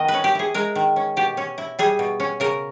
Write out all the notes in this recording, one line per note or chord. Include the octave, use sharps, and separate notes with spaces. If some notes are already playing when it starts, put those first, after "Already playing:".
Already playing: D#3 B3 D#5
B4
C#4
G4
E4 G#4
G#3 A#4
D#3
C#4
B2 G4
C#4
E4
G3 G#4
B2
C#4
C#3 A#4